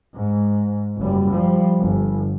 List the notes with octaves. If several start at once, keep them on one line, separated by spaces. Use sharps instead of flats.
G#2
F#1 G3
F3 G3
G1